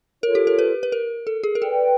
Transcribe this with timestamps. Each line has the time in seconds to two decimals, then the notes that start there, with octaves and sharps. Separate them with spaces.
0.23 F4 A4 A#4 C#5
0.35 G4
0.47 A#4
0.59 B4
0.83 B4
0.92 A#4
1.27 A4
1.43 G#4
1.55 A#4
1.61 A4 B4 D5 G5